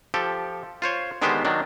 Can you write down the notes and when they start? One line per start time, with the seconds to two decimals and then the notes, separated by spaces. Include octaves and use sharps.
0.14 F3 G4 A4
0.82 F4 C5 C#5
1.22 D3 D#3 G#3 B3 G4 C5
1.45 D#3 F#3 D4